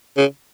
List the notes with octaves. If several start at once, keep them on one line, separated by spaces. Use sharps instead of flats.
C#3